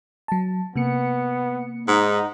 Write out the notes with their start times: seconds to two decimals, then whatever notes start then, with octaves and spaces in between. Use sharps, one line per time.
0.28 F#3 A5
0.76 C3 A#3 B3 C#7
1.88 G#2 D#4 F#5